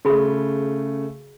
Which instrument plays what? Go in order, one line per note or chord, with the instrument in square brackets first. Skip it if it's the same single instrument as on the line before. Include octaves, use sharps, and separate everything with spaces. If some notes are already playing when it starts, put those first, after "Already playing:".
[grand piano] C#3 A3 [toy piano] F#4 G#4 B5